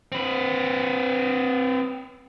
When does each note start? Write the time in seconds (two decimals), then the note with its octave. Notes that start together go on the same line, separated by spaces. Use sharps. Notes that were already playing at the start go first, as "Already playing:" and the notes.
0.12 C4 B4